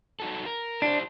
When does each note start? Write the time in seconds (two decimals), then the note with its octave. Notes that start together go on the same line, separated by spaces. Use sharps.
0.20 D#4 F#4 A4
0.46 A#4
0.82 D4 E4 G4 C5